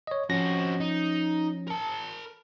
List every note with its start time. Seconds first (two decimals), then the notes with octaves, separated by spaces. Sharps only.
0.07 C#5 D#5
0.30 F3 C4 C#4 F#4 A#6
0.80 D#4
1.68 A#4 A5